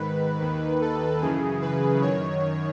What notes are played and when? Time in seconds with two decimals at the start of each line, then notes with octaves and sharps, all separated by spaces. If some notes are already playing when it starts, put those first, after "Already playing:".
Already playing: G#2 D#3 B4
0.41 D#2 D#3
0.81 A4
1.21 F#2 C#3 E3 G#4
1.61 B4
2.01 F#2 D#3 C#5